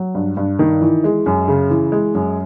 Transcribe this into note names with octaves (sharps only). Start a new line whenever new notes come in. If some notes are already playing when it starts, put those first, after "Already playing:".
Already playing: F#3
G2
G2
D#3
E3
G#3
F#2
C#3
E3
G#3
F#2